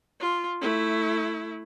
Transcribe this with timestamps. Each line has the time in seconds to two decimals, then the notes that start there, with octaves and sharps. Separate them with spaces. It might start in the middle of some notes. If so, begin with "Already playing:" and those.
0.20 F4
0.61 A3 E4